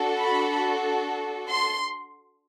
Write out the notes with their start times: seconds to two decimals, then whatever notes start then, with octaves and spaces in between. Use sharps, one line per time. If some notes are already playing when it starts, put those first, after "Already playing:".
Already playing: D4 F#4 A4
0.17 B5
1.48 C6